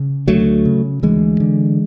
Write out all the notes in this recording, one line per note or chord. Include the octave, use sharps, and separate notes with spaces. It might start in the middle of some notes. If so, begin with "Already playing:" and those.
Already playing: C#3
D2 F#3 A3
C#3
D2 E3 G#3
D3